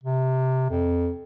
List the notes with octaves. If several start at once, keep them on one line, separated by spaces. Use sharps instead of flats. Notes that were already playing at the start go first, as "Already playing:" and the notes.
C3
F2